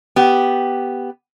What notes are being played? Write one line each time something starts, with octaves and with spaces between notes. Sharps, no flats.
B3 G4